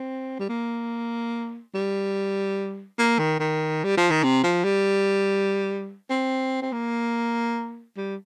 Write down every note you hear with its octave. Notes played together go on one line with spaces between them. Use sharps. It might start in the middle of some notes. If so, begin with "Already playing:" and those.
Already playing: C4
G3
A#3
G3
A#3
D#3
D#3
G3
F3
D#3
C3
F3
G3
C4
C4
A#3
G3